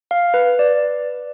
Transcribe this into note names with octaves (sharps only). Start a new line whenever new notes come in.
F5
B4
D5